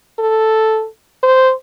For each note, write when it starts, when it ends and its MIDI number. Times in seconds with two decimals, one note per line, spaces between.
0.19 0.87 69
1.23 1.52 72